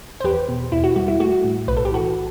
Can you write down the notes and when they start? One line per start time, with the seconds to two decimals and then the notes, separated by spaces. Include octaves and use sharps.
0.20 C5
0.24 E2 G4 B4
0.48 B2
0.72 E2 E4
0.84 F#4
0.96 G3 F#4
1.08 E4
1.20 A3 F#4
1.44 A2
1.68 B1 B4
1.77 A4
1.85 G4
1.92 E3 F#4 A4